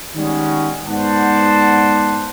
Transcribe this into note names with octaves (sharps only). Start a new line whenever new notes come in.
D#3 G3 G#3 B3 C#4
G#2 B3 C5 D5 F#5 A5